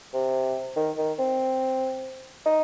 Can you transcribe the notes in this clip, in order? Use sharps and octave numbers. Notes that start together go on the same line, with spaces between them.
C3
D#3
D#3
C4
D#4